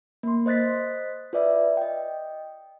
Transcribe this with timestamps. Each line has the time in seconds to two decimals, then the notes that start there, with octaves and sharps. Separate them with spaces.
0.23 A#3 C6
0.46 C5 D#5 F#6 A6 B6
1.33 F4 B4 D5 E5
1.77 D#5 G5